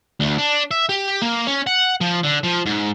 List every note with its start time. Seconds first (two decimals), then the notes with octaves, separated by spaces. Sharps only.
0.20 D2
0.38 D4
0.71 E5
0.89 G4
1.22 A#3
1.47 C#4
1.67 F#5
2.01 F3
2.24 D3
2.43 F3
2.66 G#2